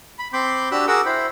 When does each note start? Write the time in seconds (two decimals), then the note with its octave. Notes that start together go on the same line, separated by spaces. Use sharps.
0.19 B5
0.33 C4 B5 C6 D6 G6
0.71 D4 F#4 G4 B5 E6 F#6
0.87 F#4 G#4 A#4 F#5 D6 E6
1.06 E4 C5 G5 B5